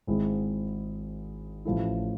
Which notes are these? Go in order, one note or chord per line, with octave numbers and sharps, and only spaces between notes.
G#1 G#2 G#3 C4 E4
A1 A2 F3 A3 E4